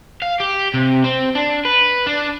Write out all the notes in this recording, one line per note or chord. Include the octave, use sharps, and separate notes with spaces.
F5
G4
C3
C4
D4
B4
D4